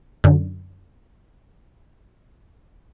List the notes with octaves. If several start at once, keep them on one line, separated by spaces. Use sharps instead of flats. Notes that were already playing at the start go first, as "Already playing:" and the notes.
F#2 D3